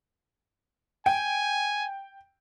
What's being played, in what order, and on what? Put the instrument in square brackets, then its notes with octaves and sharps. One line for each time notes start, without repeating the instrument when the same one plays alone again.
[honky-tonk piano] G5 [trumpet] G#5